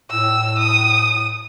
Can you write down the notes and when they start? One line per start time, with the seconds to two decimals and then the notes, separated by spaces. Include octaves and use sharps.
0.11 A2 E6
0.59 D#6